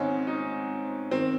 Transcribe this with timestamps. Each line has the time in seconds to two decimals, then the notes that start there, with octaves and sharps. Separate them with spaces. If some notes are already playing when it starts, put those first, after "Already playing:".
Already playing: G#2 D#3 C4 C#4 D#4
0.27 D#4
1.11 D#3 C4